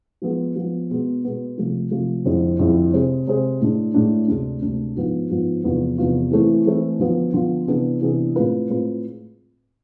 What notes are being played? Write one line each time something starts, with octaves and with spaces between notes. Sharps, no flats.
F3 G#3 B3
F3 G#3 B3
B2 G#3 B3
B2 G#3 B3
C3 F3 A3
C3 F3 A3
F2 D3 G#3 C4 E4
F2 D3 G#3 C4 E4
C3 G#3 C4 G#4
C3 G#3 C4 G#4
A2 G#3 D4
A2 G#3 D4
D2 C3 G#3 D4
D2 C3 G#3 D4
G#2 F3 B3 F4
G#2 F3 B3 F4
E2 C3 F3 B3 F4
E2 C3 F3 B3 F4
E3 A3 C4 E4
E3 A3 C4 E4
D3 F3 B3 F4
D3 F3 B3 F4
C3 E3 B3 D4 G#4
C3 E3 B3 D4 G#4
A2 G#3 C4 F4 B4
A2 G#3 C4 F4 B4